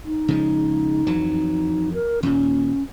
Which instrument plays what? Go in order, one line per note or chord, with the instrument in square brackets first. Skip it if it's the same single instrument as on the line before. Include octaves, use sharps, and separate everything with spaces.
[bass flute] D#4
[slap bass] C#3 F3 G#3
F2 E3 F#3
[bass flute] A#4
[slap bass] D#2 A#2 [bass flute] C#4